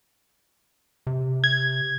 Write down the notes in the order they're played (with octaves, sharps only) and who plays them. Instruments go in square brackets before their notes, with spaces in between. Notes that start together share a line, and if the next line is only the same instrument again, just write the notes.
[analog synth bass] C3
[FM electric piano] G#6